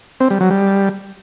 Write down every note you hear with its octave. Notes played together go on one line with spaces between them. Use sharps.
C4
G3
F#3
G3